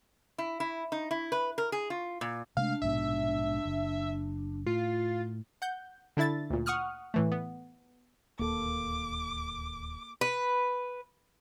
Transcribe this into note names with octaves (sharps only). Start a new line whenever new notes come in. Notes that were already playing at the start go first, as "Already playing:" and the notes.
E4
E4
D#4
E4
B4
A#4
G#4
F4
A#2
C3 G#3 A3 D4 F5
A#1 G#2 B2 E5
F#1
A2 F4
F#5 G6
D3 D4 E4 E5 A6
D2 A#2
F#5 C#6 D#6 F6 F#6
A2 E3 A3
B3
D1 D#2 A#3 A4 D6
B4